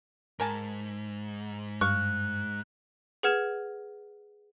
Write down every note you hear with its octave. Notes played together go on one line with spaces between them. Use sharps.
G#2 A#4 G#5 A5
G2 F5 C#6 F#6
G#4 B4 F#5 F6 G#6 E7